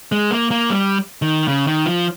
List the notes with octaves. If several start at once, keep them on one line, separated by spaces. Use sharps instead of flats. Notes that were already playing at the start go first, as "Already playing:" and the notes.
G#3
A#3
A#3
G3
D#3
C#3
D#3
F3